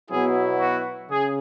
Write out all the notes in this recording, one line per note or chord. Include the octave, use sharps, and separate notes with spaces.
B2 F#3 B3 E4 G#4
F#4
C#3 G#4